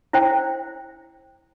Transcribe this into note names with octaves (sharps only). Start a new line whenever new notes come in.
E4 C5 G5